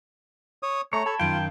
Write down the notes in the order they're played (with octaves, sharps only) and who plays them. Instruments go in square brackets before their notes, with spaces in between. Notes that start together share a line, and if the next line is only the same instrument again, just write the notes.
[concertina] C#5 D#6
[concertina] A3 A#5 [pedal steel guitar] C#5
[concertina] A4 [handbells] A5 B5 G#6
[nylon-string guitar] F#2 D#3 [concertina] F4 [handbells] F5 [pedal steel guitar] G5